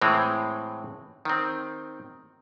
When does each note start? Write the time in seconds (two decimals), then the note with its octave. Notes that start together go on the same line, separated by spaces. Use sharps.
0.01 A2 E3 G#3 C4
1.25 D#3 C4